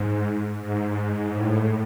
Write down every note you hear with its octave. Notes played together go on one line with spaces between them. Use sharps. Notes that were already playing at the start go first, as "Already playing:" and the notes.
Already playing: G#2
G#2
A2